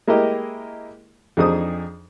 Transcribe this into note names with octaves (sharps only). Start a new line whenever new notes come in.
G#3 A#3 E4 G4 A#4 D#5
F2 D4 D#4 G#4 C5 D#6